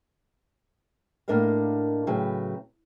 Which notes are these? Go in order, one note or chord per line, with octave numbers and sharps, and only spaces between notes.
A2 A#3 D4 A#4 D#5 F5
A2 C#3 F#3 B4 G5